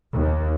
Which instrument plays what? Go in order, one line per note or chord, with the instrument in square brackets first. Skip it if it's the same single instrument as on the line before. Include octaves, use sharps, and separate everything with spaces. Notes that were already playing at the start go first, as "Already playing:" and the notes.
[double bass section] D#2